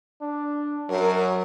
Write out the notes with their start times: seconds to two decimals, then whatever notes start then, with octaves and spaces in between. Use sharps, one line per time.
0.22 D4
0.90 F#2 F#3 A#4